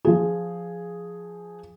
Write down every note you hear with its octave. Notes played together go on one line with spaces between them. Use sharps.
F3 G#4